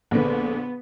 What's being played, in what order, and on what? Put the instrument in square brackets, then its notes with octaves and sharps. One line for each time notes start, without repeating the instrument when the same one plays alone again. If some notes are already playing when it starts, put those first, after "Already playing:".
[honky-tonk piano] A#1 D3 [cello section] B3